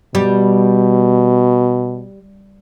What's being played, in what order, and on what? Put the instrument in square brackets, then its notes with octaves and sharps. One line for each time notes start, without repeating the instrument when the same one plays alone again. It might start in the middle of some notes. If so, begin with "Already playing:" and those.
[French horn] B2 [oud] G3